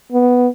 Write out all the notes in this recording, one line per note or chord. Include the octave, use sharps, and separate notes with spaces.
B3